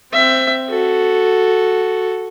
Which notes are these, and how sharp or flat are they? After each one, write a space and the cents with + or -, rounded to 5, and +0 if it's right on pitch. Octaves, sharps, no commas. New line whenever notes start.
C4 +0 E5 +15
F#4 +0 A4 +0